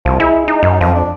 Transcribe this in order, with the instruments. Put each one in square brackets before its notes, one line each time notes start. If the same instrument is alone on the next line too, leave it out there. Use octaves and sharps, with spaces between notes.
[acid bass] C2 [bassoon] F3
[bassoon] G#3 [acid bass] E4
[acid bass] D#4
[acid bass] F#2 [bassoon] D#4
[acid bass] F2 [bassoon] F3
[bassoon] D4